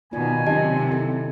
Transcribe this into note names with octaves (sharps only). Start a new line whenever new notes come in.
B2 D#3 F4 D5 G#5
C3 D#3 F#3 C#4 G4 D#5 A5
E4 A4